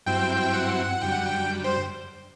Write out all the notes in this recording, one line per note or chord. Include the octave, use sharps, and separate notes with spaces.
G2 F#3 C4 E4 G5
F#5
F#2 D3 G3 G5
F#5
G5
C5